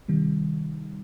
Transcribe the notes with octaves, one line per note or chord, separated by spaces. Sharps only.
C3 D#3 G3